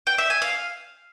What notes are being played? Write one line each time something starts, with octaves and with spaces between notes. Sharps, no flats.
G5
E5
G#5
F5